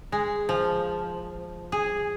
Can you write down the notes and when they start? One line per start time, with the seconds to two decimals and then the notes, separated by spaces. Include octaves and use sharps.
0.12 G#3
0.49 F3
1.72 G#4